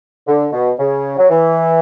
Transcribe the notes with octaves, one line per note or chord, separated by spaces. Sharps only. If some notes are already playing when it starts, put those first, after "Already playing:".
D3
B2
C#3
F#3
E3